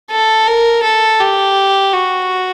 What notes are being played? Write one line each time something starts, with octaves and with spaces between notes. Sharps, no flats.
A4
A#4
A4
G4
F#4